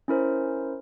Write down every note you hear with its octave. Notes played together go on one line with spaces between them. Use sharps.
C#4 E4 A#4 C5